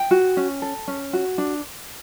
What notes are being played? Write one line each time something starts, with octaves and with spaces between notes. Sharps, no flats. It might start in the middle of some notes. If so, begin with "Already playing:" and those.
Already playing: G5
F#4
C#4
A4
C#4
F#4
D4